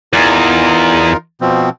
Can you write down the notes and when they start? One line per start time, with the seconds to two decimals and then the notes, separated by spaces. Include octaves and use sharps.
0.13 E2 D#4 F4 A#4
1.41 B2 F3 C4